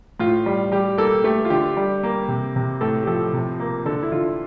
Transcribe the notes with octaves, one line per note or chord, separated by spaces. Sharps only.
A2 F4
G3
G3 G4
A#3 A4
A3 G4
F4
D3 G4
G3
A#3
C3
C3
A2 A4
G4
F3 A4
C3
A#3
D3 A4
E4
D3 F4